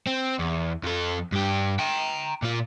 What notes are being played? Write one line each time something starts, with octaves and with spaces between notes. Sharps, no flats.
C4
E2
F2 A4
G2 G4
G5 A#5
A#2 F4